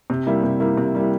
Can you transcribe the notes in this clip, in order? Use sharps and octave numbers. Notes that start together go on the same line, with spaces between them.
C3
G3 A#3 E4
C3
G3 A#3 E4
C3
G3 A#3 E4